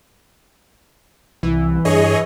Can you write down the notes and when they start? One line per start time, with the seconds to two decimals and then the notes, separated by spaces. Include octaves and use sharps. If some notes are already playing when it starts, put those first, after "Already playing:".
1.43 C2 E3
1.85 G2 G#4 C#5 D#5